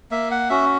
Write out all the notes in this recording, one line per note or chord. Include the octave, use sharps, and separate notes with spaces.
A#3 E5
F#5
C#4 F#4 E5